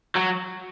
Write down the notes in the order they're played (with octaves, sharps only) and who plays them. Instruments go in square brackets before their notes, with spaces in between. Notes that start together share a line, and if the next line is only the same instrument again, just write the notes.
[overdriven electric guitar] F#3